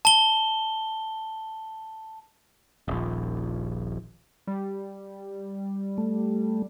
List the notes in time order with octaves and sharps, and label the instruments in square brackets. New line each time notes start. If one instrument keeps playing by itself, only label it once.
[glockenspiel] A5 G7
[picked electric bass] D#1 A#1
[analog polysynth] G3
[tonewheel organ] A3